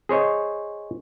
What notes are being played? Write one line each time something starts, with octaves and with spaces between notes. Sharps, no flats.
G#4 C5 C#5 D#5